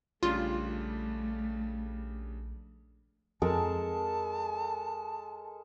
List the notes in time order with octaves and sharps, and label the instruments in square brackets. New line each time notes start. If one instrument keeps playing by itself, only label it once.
[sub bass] A#1 [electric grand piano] C#3 G3 D4 [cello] A3 [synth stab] F4
[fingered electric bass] F2 [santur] G#3 A4 A#4 [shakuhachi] A5